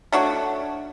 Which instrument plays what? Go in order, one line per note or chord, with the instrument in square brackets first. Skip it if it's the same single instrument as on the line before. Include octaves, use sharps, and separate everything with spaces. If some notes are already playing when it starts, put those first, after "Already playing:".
[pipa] A3 D4 F#4 C#5